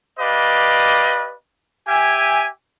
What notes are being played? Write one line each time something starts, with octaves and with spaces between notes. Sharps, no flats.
G4 B4 D5 D#5 F5
G4 E5 G#5